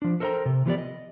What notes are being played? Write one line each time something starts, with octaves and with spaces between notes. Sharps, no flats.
F3 D4
A4 A#4 C5 D5 G5 A#5
C3
E3 F3 B3 G4 A#4 D5
D#5